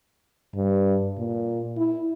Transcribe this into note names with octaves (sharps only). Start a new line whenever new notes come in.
G2
A#2
E4